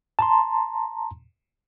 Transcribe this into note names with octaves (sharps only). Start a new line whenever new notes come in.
A5 A#5 C6